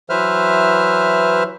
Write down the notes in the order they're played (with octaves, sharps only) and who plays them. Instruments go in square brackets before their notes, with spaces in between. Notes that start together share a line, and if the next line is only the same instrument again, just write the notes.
[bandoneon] E3 F#3 B4 C5 E5 F6